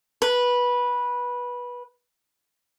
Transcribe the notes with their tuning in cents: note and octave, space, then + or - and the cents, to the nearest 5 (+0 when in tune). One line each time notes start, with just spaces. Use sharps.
B4 -15